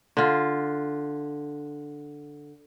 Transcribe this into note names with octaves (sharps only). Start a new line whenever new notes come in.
D3 F4